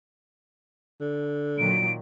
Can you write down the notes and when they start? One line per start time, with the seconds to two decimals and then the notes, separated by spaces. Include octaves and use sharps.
1.00 D3
1.58 A#2 D#3 F#3 D7